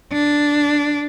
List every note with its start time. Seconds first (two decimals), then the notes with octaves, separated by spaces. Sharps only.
0.12 D4